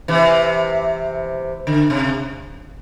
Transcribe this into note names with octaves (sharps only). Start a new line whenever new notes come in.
C3 E3
D3
C3